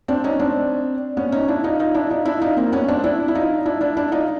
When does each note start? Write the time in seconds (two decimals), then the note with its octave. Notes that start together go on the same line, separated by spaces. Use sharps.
0.08 C4 D4
0.24 C#4 D#4
0.40 C4 D4
1.17 B3 C#4
1.32 C#4 D#4
1.48 D4 E4
1.64 D#4 F4
1.79 D#4 F4
1.94 D4 E4
2.10 D#4 F4
2.25 D4 E4
2.42 D#4 F4
2.57 A#3 C4
2.72 B3 C#4
2.88 C4 D4
3.04 D4 E4
3.28 E4
3.35 D#4 F4
3.65 D4 E4
3.81 D4 E4
3.97 D4 E4
4.12 D#4 F4